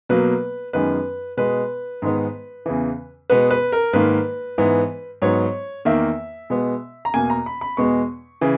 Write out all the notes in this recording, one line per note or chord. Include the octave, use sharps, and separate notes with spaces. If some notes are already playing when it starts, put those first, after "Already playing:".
B2 F#3 A#3 B4
F#2 D#3 G#3 B3 B4
B2 G#3 B3 B4
G#2 D#3 G#3 B3
E2 C#3 E3
B2 G#3 B3 B4
B4
A#4
G#2 D#3 A#3 B4
G#2 E3 B3
G#2 F#3 B3 C#5
E2 D#3 A#3 E5
B2 G#3 B3
A#5
E2 B2 A#3 G#5
A#5
B5
B5
E2 B2 G#3 B3 C#6
C#3 E3